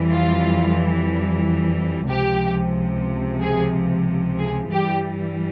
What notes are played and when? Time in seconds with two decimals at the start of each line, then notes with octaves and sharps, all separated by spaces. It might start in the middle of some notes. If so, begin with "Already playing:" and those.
Already playing: F2 E3 G3
0.10 F4
2.08 C#2 C3 F3 G4
3.40 G#4
4.39 G#4
4.71 G2 E3 G3 G4